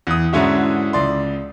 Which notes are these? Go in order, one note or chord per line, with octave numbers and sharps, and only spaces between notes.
E2 D#6
G#2 D3 C#4 E4 F#4
C#2 D5 C6